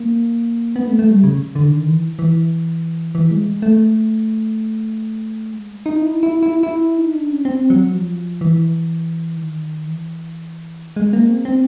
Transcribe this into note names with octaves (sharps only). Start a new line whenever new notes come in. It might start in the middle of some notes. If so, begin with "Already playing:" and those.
Already playing: A#3
B3
A3
A3
G3
C#3
D3
D#3
E3
E3
E3
G#3
A3
G#3
D#4
E4
E4
E4
E4
D#4
D4
C#4
C4
F#3
F3
E3
D#3
E3
G#3
A#3
C4
C4